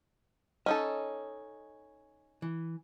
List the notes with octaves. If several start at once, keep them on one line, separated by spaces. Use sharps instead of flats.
C#4 D#4 A4 D#5
E3